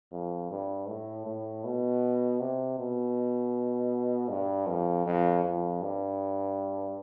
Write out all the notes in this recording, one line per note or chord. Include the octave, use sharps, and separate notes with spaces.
F2
G2
A2
A2
B2
C3
B2
G2
F2
F2
F2
G2